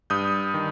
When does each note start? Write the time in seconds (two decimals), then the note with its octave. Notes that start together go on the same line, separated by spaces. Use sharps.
0.10 G2 D#6 G6
0.54 D#3